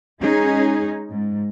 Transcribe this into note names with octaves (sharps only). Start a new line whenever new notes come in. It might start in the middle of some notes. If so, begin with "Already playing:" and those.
G#3 C#4 D#4 G#4
G#2